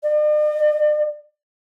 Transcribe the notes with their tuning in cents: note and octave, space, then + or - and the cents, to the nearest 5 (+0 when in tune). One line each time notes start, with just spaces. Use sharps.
D5 +45